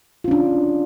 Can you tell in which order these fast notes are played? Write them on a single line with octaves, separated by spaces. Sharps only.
F4 C#4 D4